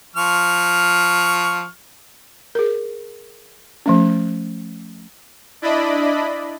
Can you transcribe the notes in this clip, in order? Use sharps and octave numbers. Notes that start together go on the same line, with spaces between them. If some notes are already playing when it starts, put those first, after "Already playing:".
F3 C#6 F6
G#4 A#4
F3 A3 C#4
D4 E4 D5 D#5 B5